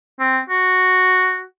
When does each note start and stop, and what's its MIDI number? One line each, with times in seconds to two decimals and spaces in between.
0.20 0.39 60
0.50 1.44 66